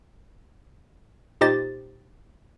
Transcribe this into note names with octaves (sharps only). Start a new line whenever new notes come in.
A#2 D#4 G4 C5 D#5 A6